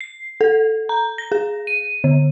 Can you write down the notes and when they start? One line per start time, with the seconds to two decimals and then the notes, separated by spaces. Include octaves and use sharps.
0.01 C7
0.41 A4
0.89 A#5
1.18 A#6
1.32 G#4
1.67 D#7
2.04 D3